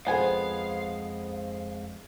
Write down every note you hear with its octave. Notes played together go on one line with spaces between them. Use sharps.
F2 G#3 B3 A4 C5 F5 G#5